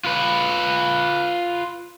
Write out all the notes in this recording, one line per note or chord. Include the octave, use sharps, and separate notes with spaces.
F4 B4